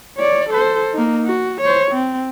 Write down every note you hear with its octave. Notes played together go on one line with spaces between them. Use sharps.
C#5 D5
A4 C5
A#3 D#4
F#4
C5 C#5
C4